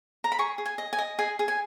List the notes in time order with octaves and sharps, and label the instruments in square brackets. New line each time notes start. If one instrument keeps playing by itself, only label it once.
[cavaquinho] A#5
B5
G#4 C#6
G#4
G#5
D#5
G#5
D#5
G#4 G#5
G#4
G#5